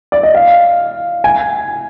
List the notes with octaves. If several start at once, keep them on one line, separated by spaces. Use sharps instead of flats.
D5
D#5
F5
G#5